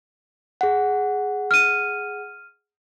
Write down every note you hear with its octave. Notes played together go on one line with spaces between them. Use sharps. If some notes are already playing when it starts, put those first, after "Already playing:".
G#4 F#5
F6 D#7